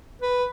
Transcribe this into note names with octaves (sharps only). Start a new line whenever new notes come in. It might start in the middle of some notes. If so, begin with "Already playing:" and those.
B4